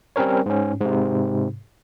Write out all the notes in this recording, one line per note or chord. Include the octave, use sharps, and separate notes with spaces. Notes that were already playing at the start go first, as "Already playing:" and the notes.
G3 C4 C#4 A#4 C#5
G#2 C#4
G#2 C3